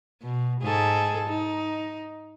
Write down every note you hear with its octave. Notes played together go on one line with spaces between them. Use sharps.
B2
G#2 G#4 A4
D#4